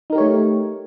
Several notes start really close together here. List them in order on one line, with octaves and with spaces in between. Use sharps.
D#4 A#4 G4 C#5 A3